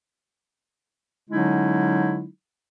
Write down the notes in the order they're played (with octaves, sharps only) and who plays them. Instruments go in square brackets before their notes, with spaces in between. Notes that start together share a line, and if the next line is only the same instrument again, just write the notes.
[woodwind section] D3 F#3 G#3 C#4 D#4 E4